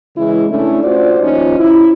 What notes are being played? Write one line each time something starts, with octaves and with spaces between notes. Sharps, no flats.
C#3 E3 G#3 E4
A3 C#4 D4 E4
F4 F#4 C5 D5
D#2 F3 C#4 D#4
E4